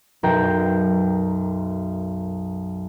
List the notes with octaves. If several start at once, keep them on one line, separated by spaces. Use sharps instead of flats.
B1 F#2 A#4 G5 A#5 C7